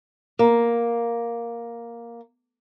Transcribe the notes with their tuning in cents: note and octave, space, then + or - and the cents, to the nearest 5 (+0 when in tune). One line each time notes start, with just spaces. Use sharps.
A#3 +5